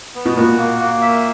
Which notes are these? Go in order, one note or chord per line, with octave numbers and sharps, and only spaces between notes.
B3
B2
A#2 F#4
A#3
A#3
E5